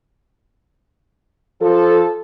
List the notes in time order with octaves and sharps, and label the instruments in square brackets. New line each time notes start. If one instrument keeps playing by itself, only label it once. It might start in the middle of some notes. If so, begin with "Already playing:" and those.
[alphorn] F3 [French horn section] A4